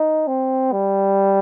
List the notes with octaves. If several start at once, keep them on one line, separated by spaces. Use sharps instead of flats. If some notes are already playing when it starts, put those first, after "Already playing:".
Already playing: D#4
C4
G3